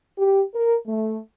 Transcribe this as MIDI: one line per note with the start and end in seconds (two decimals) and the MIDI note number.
0.18 0.42 67
0.54 0.75 70
0.86 1.19 57